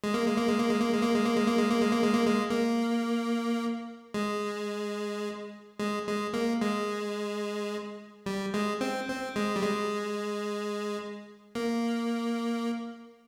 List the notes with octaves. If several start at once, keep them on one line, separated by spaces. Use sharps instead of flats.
G#3
A#3
G#3
A#3
G#3
A#3
G#3
A#3
G#3
A#3
G#3
A#3
G#3
A#3
G#3
A#3
G#3
A#3
G#3
A#3
G#3
A#3
G#3
G#3
G#3
A#3
G#3
G3
G#3
C4
C4
G#3
G3
G#3
A#3